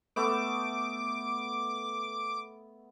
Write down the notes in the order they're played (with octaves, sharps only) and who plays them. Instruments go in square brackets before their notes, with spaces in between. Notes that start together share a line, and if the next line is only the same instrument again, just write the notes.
[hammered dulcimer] A3 B3 E5 [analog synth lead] D6